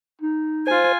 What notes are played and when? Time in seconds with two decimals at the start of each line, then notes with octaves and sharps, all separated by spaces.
0.21 D#4
0.67 F4 C5 G#5